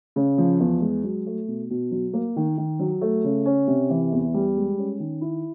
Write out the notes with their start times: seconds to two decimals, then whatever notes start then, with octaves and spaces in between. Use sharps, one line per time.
0.16 C#3
0.38 F3
0.60 E2
0.81 G#3
1.03 F#3
1.26 A3
1.48 B2
1.70 B2
1.91 F#3
2.13 A#3
2.36 D#3
2.58 D#3
2.79 F#3
3.01 A3
3.24 C#3
3.46 C#4
3.67 C3
3.90 E3
4.12 E2
4.34 G3
4.56 G#3
4.78 C#4
5.00 D#3
5.21 E4